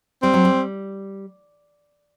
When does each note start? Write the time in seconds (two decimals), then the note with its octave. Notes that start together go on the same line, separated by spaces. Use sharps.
0.22 G3 C4
0.34 F#3
0.45 G3